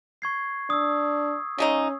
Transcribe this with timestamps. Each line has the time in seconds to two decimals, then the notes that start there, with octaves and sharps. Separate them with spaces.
0.22 C#6 G#6 C7
0.70 D4 D#6 E6
1.58 C#3 G#3 C#4 D#4